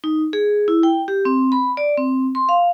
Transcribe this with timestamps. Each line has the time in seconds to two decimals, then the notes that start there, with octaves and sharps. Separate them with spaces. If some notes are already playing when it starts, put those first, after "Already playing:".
0.04 D#4
0.33 G#4
0.68 E4
0.83 G5
1.08 G4
1.25 C4
1.52 B5
1.77 D5
1.97 C4
2.35 C6
2.49 F5